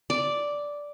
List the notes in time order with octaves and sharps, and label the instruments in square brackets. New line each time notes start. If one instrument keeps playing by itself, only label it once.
[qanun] D5